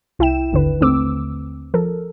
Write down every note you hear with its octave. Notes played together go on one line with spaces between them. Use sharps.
C2 E4 E5 G5 E7
G#1 D#2 D3 D#3 B4
D#2 D3 A3 C4 D6 E6
F3 A4 A#4